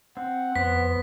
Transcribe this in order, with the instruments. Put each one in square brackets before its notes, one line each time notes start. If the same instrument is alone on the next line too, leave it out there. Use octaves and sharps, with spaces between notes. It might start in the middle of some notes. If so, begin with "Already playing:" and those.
[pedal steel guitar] C4 [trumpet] F#5
[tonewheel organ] F2 C5 [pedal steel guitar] B3 [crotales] B6